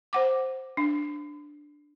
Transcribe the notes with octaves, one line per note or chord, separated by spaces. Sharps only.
C5 F#5 D6
D4